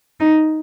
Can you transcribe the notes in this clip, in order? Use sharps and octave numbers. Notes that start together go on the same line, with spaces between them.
D#4